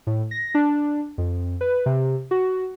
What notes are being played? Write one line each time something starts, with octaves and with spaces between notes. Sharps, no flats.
A2
A#6
D4
F2
B4
C3
F#4